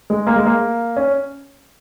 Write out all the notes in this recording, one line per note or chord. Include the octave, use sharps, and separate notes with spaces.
G#3
A#3
G#3
A#3
C#4